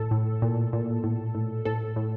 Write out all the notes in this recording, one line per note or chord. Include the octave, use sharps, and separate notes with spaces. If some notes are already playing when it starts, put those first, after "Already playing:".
Already playing: A2 A4
A2
A#2
A#2
A2
A2
A2 A4
A2